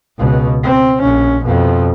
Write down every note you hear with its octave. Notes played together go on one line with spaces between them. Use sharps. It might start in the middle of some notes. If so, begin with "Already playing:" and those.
C#2 B2
C4
A#1 C#4
F2 B2